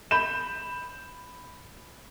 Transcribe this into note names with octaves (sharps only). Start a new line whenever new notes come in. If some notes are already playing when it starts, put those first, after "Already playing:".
B5 G6 E7